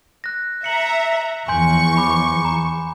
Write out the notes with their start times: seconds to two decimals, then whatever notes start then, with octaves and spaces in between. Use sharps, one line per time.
0.24 F#6 A#6
0.64 E5 A#5 C#7 F#7
1.48 E2 F3 G#5 C6 C#6 G6
1.97 B5 D6
2.45 A#5